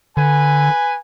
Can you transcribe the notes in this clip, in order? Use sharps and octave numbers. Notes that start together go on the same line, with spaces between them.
D3 B4 G#5